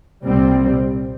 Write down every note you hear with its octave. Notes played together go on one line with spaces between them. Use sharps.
C2 A#2 G3 C4